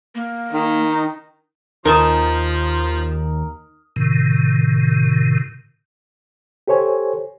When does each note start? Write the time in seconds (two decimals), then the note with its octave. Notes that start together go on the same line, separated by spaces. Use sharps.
0.15 A#3
0.52 D#3
0.90 D#4
1.85 D#2 F3 D#4 A#4 G#5 A5 C6 D#6
3.96 A2 C3 D#3
6.68 G4 A4 C5 C#5 G#5